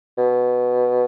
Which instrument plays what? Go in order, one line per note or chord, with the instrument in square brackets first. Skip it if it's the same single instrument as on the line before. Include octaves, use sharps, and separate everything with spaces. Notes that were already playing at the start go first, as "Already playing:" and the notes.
[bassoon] B2